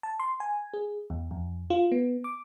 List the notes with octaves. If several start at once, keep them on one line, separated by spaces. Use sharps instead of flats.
A5
C6
G#5
G#4
E2
F2
F4
B3
D6